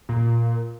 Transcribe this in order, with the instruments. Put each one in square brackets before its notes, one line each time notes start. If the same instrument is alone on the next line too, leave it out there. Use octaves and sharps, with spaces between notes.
[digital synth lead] A#2